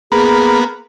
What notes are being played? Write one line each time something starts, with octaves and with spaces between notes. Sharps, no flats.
A#3 B3 G#4